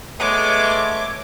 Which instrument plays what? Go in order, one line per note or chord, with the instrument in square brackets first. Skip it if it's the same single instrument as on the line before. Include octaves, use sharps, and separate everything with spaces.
[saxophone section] G#3 B3 [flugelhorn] A3 [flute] C#5 [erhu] D6